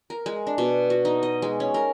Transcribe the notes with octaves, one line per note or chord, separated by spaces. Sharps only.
A#4
G#3
D4
B2
F#4
D#4
D#5
G#3
C#4
A#4